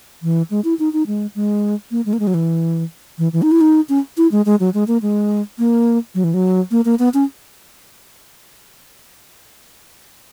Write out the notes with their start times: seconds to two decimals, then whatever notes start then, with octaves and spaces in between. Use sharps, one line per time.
0.23 E3
0.50 G#3
0.64 E4
0.79 D#4
0.93 D#4
1.07 G#3
1.35 G#3
1.91 A#3
2.06 G#3
2.13 A#3
2.20 G#3
2.27 F#3
2.34 E3
3.18 E3
3.33 E3
3.42 D#4
3.51 E4
3.61 D#4
3.89 C#4
4.17 E4
4.32 G#3
4.46 G#3
4.60 F#3
4.74 G#3
4.88 A#3
5.02 G#3
5.58 A#3
6.15 F#3
6.24 E3
6.34 F#3
6.71 A#3
6.85 A#3
6.99 B3
7.14 C#4